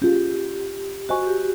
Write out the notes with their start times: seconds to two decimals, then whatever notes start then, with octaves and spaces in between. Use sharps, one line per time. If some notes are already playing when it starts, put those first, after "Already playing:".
0.02 C#4 F4 G4 G#4
1.09 F#4 C5 D#5 G#5 C#6
1.27 G4